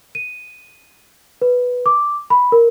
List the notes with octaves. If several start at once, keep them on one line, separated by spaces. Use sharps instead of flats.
D#7
B4
D6
B5
A#4